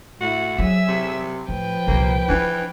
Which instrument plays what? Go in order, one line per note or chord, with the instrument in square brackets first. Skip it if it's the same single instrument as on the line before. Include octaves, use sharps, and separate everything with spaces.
[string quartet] A2 E4 [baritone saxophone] F#4
[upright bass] F#3 [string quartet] G#4 E5 E6
[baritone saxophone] C3
[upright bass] A2 [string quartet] F3 B4 G5
[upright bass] C2 A#2 [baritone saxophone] A#3
[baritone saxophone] E3 [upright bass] D4 F4